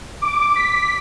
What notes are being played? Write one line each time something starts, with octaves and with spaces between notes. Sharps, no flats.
D6
B6